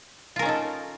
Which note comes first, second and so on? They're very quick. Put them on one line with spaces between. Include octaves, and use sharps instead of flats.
F4 A#4 C#4 D#4 A4